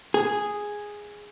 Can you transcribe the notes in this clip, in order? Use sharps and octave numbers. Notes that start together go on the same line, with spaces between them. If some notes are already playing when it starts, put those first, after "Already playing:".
G#4